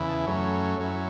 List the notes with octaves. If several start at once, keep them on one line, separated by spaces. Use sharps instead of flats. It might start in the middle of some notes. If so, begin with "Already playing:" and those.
Already playing: E2 C#3 E3 E4
A5
F#2 F#3 A3 C#4
F#2 F#3 C#4 E4